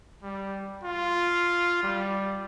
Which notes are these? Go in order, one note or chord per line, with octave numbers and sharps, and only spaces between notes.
G3
F4
G3